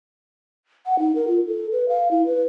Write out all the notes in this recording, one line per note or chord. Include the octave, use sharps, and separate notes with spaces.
F#5
D#4
A#4
F4
A4
B4
F5
E4
B4